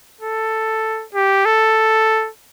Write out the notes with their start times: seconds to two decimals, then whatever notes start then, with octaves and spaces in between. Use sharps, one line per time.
0.21 A4
1.15 G4
1.45 A4